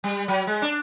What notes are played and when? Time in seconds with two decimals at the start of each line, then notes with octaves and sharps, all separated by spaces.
0.04 G3
0.28 F#3
0.47 G#3
0.62 D4